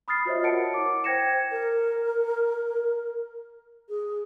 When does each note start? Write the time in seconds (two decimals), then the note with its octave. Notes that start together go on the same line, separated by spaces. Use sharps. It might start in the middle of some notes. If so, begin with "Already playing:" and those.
0.08 B5 D#6 F6 A6 C7
0.25 F4 F#4 C5 C#5 D#5 E5
0.43 A#4 C#5 F#5 A5 C#7 D7
0.74 E4 D6
1.04 C5 G5 G#6 A#6 C#7 E7
1.51 A#4
3.89 G#4